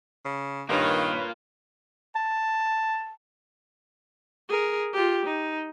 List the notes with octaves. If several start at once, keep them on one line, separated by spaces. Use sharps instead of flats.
C#3
G2 D#3 A#3 F4 A#4 B4 C#5
A5
G#4 A#4
F4 G4
D#4